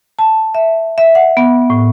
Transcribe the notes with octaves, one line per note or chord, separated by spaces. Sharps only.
A5
E5
E5
F#5
B3
A2